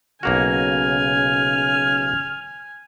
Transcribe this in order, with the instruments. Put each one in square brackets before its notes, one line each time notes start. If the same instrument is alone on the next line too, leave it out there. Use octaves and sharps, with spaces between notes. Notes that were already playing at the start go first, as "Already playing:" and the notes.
[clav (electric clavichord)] B1 A#3 F#4 [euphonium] C#3 [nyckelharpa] G#5 [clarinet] F6